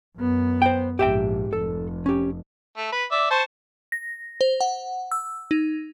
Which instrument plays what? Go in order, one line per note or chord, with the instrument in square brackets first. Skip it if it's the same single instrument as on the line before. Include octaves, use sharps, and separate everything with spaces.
[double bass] F#2 B3
[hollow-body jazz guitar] C5 G5
[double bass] A#1 G#2 [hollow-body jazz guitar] G4 E5 G5
[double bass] F1 [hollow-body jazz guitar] A4
[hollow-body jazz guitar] C#4 G4
[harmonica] A3
B4
D5 E5
C5 A5 C#6
[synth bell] A#6
C5
F#5
E6
D#4